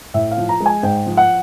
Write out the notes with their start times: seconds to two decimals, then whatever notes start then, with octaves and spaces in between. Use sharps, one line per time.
0.14 A2 E5
0.31 F5
0.37 F3
0.49 A#5
0.60 G#3
0.66 G#5
0.83 G#2 G5
1.06 F3
1.17 F#5